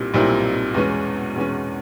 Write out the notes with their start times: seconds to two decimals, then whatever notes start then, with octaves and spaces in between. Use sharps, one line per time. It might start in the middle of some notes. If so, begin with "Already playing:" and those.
Already playing: B1 A#2 G3 C4 E4
0.14 B1 A#2 G3 C4 E4
0.74 E2 B2 G#3 C#4
1.36 E2 B2 G#3 C#4